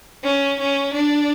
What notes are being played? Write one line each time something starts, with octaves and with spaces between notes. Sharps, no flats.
C#4
C#4
D4